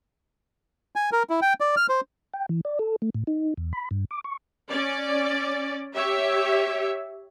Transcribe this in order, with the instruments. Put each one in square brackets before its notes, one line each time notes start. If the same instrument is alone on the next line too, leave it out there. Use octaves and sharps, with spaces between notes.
[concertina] G#5
A#4
E4
G5
D5
F6
C5
[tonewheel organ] G5
E3
D5
A4
A3
A2
D#4
E2
B5
G2
D6
C#6
[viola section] C#4 D5
G4 C#5 E5